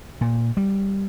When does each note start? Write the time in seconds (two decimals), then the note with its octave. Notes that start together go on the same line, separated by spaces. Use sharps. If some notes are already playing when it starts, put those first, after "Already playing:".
0.21 A#2
0.57 G3